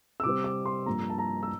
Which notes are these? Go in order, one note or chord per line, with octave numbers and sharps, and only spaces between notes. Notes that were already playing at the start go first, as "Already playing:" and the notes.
E6
C3 G3 C4 D6
D6
C6
G2 F3 A#3 A#5
A5
A#5
E6